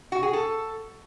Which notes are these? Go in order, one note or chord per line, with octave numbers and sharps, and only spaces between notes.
F#4
G#4
A4